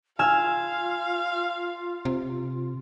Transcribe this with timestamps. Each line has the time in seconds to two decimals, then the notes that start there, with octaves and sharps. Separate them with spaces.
0.19 F4 F5 G#5 E6 F6
2.05 C3